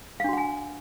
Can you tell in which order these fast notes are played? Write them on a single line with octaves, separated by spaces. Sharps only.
F5 D4 F#4 F#5 G#5